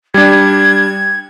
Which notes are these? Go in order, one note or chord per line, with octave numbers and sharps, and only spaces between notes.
G3 D4 G#6